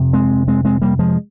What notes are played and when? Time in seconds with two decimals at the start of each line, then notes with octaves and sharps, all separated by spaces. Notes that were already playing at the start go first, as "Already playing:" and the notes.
Already playing: F2 C3
0.13 G#3 C4
0.48 G#3 C4
0.65 G#3 C4
0.82 G3 A#3
0.99 F3 G#3